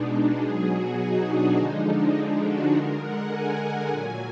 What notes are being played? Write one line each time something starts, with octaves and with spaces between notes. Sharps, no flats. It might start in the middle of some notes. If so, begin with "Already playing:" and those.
Already playing: B2 G#3 D4 D#4
D#4
B2 F#3 G#4
F#4
D#4
D4
D3 F3 G#3 D#4
D4
D#4
F#4
D3 G#3 A#4
F#5
G#5
A#2 F#3